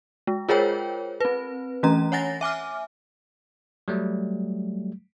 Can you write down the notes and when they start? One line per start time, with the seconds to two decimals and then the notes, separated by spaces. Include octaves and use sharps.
0.27 G#3
0.49 F4 G#4 A#4 C5 C#5 G5
1.20 C4 B4
1.83 E3 A3 C#4 A#5
2.12 C#5 F#5 G#5 A6 A#6
2.41 E5 G#5 D6 F6
3.88 F#3 G3 A3